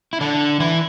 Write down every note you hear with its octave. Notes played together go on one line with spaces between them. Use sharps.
E4
D3 D4
E3 E4